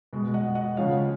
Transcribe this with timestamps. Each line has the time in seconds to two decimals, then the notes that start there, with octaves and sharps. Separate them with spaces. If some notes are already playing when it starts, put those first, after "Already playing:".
0.13 B2 G#3
0.34 D#5 F#5
0.55 D#5 F#5
0.77 C#3 F3 G#3 C#5 F5